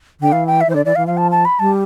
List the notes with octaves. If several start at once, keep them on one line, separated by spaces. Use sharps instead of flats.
D3 G5
E3 F5
G5
E5
E3
C5
D3 D5
E3 D5
E3 F5
F3 F5
A5
A5
B5
G3 A5